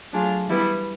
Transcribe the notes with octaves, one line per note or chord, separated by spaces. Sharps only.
F#3 A3 D4 F4 G#4
E3 G3 B3 E4